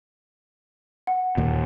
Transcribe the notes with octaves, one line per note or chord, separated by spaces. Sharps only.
F#5
D#2 A#2